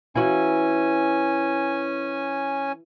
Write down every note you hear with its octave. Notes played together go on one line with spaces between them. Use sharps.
E3 C#4 F#4 G#5